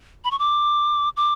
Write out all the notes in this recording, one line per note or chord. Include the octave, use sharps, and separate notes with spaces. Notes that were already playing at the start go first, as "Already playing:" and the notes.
B5
C#6
D6
D6